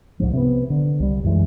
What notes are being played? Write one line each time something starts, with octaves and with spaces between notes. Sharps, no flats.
C2 G#2 F3
C3 A#3 B3
D3
C2 G3
F#2 E3 G#3